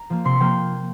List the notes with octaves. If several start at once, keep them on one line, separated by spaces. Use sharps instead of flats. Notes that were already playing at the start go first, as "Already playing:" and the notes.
Already playing: A#5
F3 A#3
C3 C6
F3 A#3 G5